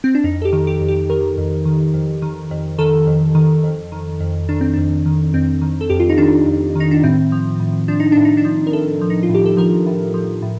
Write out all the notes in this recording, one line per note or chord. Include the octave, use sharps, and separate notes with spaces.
C4
D4
F2 D#4
A4
G4
D#3
G4
F2
G4
D#3 A#4
F2
D#3
F2
D#3
F2
D#3 A4
F2
D#3
F2
D#3
F2
D#3 D4
C4
F2 D4
D#3
F2 C4
D#3
A4
F2 G4
F4
D#4
D#3 D4
F2
D#3 D#4
D4
A2 C4
F3
A2
F3 D4
D#4
A2 D4
D#4
D4
F3
A#4
A2 A4
F3
D#4
F4
A2
G4
A4
F3 A#4
A2
F3
A2